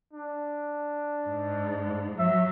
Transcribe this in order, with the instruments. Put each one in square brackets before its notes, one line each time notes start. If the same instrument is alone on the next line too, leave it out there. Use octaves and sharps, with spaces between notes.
[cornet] D4
[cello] G#2
[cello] F#3 [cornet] E5